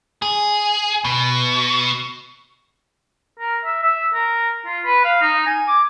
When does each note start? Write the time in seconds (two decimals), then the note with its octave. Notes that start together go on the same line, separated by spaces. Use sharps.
0.22 G#4
1.04 B2
3.39 A#4
3.65 E5
3.83 E5
4.14 A#4
4.65 F4
4.85 B4
5.05 F5
5.21 D#4
5.46 G#5
5.68 D6